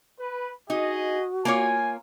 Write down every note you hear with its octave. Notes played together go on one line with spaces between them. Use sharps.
B4
D#4 F#4 G#4 D#5
A#3 F4 C#5 G#5